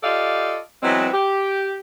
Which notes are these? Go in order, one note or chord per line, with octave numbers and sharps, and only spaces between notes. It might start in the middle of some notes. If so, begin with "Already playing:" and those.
F4 G4 A4 D5 D#5 F5
E3 F#3 G#3 B3 C4
G4